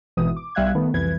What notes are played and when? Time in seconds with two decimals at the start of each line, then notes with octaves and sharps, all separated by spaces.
0.17 G#1 B2 E3 D#6
0.37 D6
0.55 B1 G3 E5 F5 F#6 G#6
0.75 D#3 A3 B3
0.94 C2 F2 E3 B4 G#6